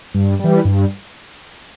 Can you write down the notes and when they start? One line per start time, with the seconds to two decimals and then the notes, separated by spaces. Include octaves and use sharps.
0.14 G2
0.39 E3 G3
0.65 G2